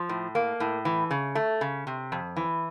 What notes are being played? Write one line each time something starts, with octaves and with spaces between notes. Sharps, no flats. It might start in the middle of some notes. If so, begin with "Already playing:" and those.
Already playing: F3
A2
A#3
A2
E3
C#3
A3
C#3
C3
F2
E3